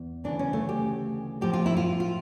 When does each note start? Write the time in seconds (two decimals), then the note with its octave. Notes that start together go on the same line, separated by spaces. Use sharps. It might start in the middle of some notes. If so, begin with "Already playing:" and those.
Already playing: E2
0.24 D2 C#3 E3 D4
0.39 C#4
0.53 A3
0.69 G4
1.41 A2 F3 G4
1.53 F4
1.66 E4
1.77 F4
2.00 F4